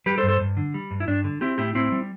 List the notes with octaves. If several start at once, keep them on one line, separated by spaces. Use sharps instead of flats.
G3 G4 B4
A4 C5
G2
A4 C5
G2
D3
G3
G2
E4
G2 D4
D3
C4 E4 G4
A2 E4 G4
A2 C4 E4
G3